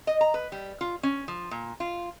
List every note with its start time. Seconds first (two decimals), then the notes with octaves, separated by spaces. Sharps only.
0.07 D#5
0.21 A#5
0.34 B4
0.52 G3
0.81 F4
1.03 C#4
1.28 F3
1.51 A#2
1.80 F4